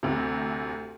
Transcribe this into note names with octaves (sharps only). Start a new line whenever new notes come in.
D2 C3